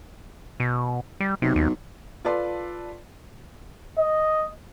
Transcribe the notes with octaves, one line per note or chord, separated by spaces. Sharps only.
B2
G3
B1 C3
D#2
F4 A4 B4 D5 A5 C6
D#5